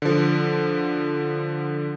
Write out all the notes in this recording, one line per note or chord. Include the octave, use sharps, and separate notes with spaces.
D3 F3